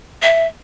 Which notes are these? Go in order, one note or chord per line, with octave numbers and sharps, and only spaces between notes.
E5